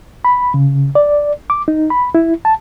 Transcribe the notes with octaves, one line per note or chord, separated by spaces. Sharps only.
B5
C#3
D5
D6
D#4
B5
E4
A5